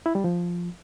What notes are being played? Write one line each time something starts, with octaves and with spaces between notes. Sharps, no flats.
E4
G3
F3